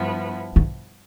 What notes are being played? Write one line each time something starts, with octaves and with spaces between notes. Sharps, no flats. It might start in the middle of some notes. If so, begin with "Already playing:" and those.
Already playing: G2 F3 B3 E4
D3